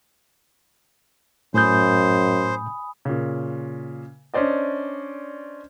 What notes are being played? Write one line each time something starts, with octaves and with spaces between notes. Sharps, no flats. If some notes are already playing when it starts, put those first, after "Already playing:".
F#2 A2 C5 G#5 B5 D#6 G6
A#2 C#3
C#4 D4 C5 D5 D#5